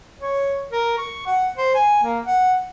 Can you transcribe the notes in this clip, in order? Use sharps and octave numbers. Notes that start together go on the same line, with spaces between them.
C#5
A#4
C#6
F#5
C5
G#5
A#3
F#5